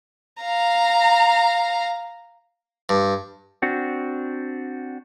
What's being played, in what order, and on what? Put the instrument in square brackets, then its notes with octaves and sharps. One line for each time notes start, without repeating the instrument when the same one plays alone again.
[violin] F5 A#5
[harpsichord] G2
[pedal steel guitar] C4 D4 F#4